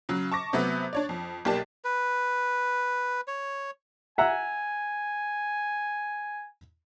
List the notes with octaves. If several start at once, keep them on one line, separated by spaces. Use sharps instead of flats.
C#3 F#3
A5 C#6 D6 A#6
C3 F#3 A3 B3
D4 C#5 D5
F2
B1 A#3 G4 D5 A5
B4
C#5
E5 F#5 G#5 A#5